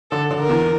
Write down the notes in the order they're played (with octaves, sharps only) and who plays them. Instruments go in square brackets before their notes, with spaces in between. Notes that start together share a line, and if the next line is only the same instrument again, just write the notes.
[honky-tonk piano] D3 [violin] A4
[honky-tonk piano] D3
[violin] A#4
[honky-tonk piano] E2 E3